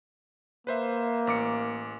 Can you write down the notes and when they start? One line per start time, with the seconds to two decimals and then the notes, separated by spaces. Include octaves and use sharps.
0.67 A#3 B4 C5 E5
1.27 A1 D6 C#7